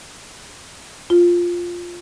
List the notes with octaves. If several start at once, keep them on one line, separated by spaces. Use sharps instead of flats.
F4